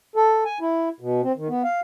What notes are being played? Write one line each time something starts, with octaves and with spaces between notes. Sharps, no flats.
A4
G#5
E4
B2
C4
D#3
B3
F5